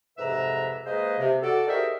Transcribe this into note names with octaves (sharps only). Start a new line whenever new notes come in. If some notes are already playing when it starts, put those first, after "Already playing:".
F2 G#2 C3 B4 E5 A#5
G#3 A#3 G#4 B4 C5 D#5
C3
F#4 A4 D5
D#4 G4 G#4 A#4 C5 E5